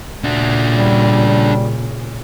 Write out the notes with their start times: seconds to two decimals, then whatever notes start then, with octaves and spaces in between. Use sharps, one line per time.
0.24 A#2 C#3 D4 F#4
0.74 G3